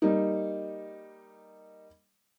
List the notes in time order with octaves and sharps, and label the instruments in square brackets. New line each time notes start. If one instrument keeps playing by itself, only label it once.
[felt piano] G3 A#3 D#4